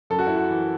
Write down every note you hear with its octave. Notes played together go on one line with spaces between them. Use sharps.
F#2 A4
F#4
E4
F#4
E3